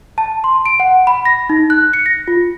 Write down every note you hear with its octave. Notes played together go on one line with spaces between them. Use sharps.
A5
C6
D7
F#5
B5
A#6
D#4
F#6
C#7
A#6
F4